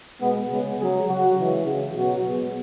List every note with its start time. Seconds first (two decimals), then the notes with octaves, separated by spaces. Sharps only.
0.20 B2 G#3 B3
0.49 C#3 G#3 B3
0.78 C#3 F#3 G#4
1.07 C#3 F#3 F#4
1.36 C#3 E3 G#3
1.65 C#3 F#3
1.94 B2 F#3 F#4
2.23 B2 G#3